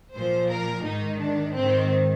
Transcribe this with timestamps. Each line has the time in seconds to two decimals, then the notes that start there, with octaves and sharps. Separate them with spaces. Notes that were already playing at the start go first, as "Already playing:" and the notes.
0.15 A#2 F3 C5
0.50 A#4
0.85 G#2 D#3 D#4
1.20 D4
1.54 G#2 D#3 C4